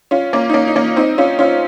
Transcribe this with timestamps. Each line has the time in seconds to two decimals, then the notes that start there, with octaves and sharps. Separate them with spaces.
0.11 C#4 F4
0.33 A#3 C#4
0.49 D#4
0.54 A#3 C#4
0.68 D#4
0.75 A#3 C#4
0.96 C4 D#4
1.18 C#4 F4
1.39 C#4 F4